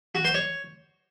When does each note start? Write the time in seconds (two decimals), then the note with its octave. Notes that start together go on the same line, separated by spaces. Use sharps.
0.15 F#4
0.25 C5
0.34 C#5